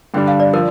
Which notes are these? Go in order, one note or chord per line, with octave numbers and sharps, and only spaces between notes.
G2 D3 G3 D4 G5
F5
D5
F3 A#4